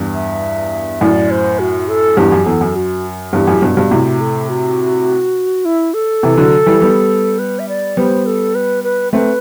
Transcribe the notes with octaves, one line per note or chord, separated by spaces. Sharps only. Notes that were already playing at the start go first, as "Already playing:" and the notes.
Already playing: E2 G2
E5
F#2 A2 D5
C5
F#4
A4
E2 G2 G4
F#2
E2 A4
F#2
F#4
E2 G2 G4
F#2 A2
G2 B2
G2 B2
A2 C3 F#4
A4
F#4
E4
A4
C3 E3
D3 F#3
E3 G3
G3 B3
B4
E5
D5
G3 B3 C5
A4
B4
B4
A3 C4 B4 C5